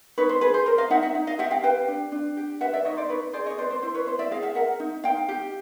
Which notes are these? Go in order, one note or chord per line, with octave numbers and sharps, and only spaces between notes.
D#4 B4 C#5
C5
G#4 B4
C5
A#4 C5
D#5 F5
D#4 E5 F#5
E5 F#5
D#4
D#5 F5
G4 E5 F#5
F5 G5
B4 F5 G5
D4
D4
G4
B4 E5 F#5
D5 E5
D#4 C#5 D#5
C5 D5
D#4 B4 C#5
G#4 C5 D5
C#5 D#5
B4 C5 D5
C5
E4 C5
B4 C#5
E4 C5
D5 E5
G#4 D#5 F5
E5 F#5
A#4 E5 F#5
D#4
D#4 F5 G5
G4